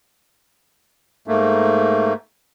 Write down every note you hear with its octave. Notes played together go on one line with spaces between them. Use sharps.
G#2 A3 A#3